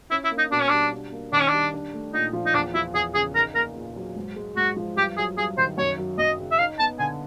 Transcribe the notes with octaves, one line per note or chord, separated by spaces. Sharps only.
C#4 E4
E4
A#3
D#4
B2 D4
C#4
G3 D4
D4
A#3
D#3 D4
C#4
G3 D4
D4
A3
A#2 D#4
F3
D#4
E2 D4
F3 E4
E2 G#4
C#3 G#4
D#4 A#4
A#3 A#4
A#2
F#3
G#2
G#3
G#2 F#4
F3
G2 G4
F#3 G#4
G2 G#4
D#3 C5
F#2 C#5
F#3
F#2 D#5
C#3
E5
D#4 F5
B3 A5
D3 G#5